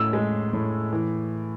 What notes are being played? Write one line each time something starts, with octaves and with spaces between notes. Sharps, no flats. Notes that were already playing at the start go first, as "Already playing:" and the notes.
Already playing: A2 C#4 E6
G#3
A2
E3